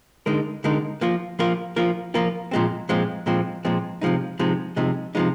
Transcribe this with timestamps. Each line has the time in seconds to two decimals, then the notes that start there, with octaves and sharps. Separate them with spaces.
0.26 D3 G#3 D#4 A#4
0.64 D3 G#3 D#4 A#4
1.01 F3 A#3 F4 A#4
1.39 F3 A#3 F4 A#4
1.76 F3 A#3 F4 A#4
2.14 F3 A#3 F4 A#4
2.51 A#2 F3 G#3 C4
2.89 A#2 F3 G#3 C4
3.26 A#2 F3 G#3 C4
3.65 A#2 F3 G#3 C4
4.01 C3 F3 G#3 D#4
4.39 C3 F3 G#3 D#4
4.76 C3 F3 G#3 D#4
5.15 C3 F3 G#3 D#4